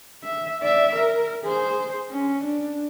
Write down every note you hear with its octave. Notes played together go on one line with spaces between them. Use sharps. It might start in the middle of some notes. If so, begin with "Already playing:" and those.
E5
D5 E5
A#4
G#4 C5
C#4
D4